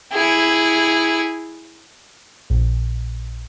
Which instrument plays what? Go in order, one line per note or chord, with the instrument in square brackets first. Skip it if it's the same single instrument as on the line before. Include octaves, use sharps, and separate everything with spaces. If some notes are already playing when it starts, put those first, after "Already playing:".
[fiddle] E4 G#4
[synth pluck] A#1